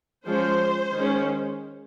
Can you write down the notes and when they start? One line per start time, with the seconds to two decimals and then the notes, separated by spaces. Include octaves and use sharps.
0.25 F3 G#3 C#4 C5
0.94 D#3 G#3 C#4